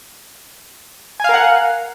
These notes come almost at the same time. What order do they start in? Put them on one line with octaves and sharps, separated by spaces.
G#5 F5 A#4 F#5